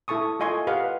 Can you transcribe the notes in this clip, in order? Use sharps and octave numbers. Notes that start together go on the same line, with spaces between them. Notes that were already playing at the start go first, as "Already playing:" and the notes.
E4 A4 A5 C#6 D#6
F4 A4 D#5 G#5 C6 C#6
G4 B4 D#5 F5 F#5